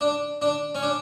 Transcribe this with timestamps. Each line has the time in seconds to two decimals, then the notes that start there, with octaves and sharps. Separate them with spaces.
0.01 D4
0.42 D4
0.75 C#4
0.83 D4